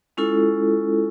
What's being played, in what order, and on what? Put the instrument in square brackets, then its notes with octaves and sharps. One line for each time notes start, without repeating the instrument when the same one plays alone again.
[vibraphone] G#3 C#4 E4 F4 A4